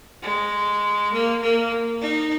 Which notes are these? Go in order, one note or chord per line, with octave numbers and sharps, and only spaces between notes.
G#3
A#3
A#3
D#4